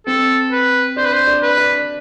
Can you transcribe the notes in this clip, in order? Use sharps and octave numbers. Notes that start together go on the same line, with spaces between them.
C4 A4
B4
D4 C5
B4
C5
D4
B4
D4